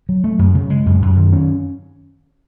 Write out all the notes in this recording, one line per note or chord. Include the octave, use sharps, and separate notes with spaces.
F#3
A3
F#2
C#3
G#3
F#2
F#2
D#3
C#4